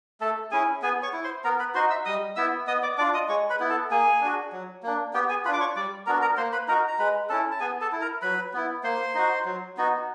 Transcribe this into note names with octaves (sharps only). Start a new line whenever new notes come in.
A3 A4 A5
C#4 E4 G#4 G#5
B3 G#4 G#5
C#5 C#6
E4
C5 C6
B3 A#4 A#5
B4 B5
D#4 F#4 C5 C6
E5 E6
G3 D#5 D#6
B3 E4 E5 E6
B3 D#5 D#6
D5 D6
D4 F4 D5 D6
D#5 D#6
G#3 C#5 C#6
B4 B5
B3 E4
A4 A5
A#3 G#4 G#5
D4 F#4
F#3
A#3 D4
B3 G4 G5
G#4 G#5
D4 F4 B4 B5
D6
C#5 C#6
G3 D5 D6
B3 D4 F#4 A#4 A#5
A#4 A#5
A#3 C5 C6
B4 B5
D#4 F#4 A#4 A#5
A#5
G#3 B4 B5
C#4 E4 A4 A5
A5
B3 G#4 G#5
A4 A5
E4
A#4 A#5
F#3 B4 B5
B3 E4
A#3 C5 C6
D#4 F#4
F#3
B3 D#4 F#4